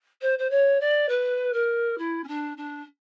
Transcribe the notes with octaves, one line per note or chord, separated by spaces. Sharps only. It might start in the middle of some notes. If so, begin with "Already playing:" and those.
C5
C5
C#5
D5
B4
A#4
E4
C#4
D4
D4